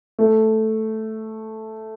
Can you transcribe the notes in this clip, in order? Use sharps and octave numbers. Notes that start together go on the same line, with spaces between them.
A3